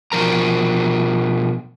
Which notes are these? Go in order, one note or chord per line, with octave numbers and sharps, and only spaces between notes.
B2 F3 A#4 A#5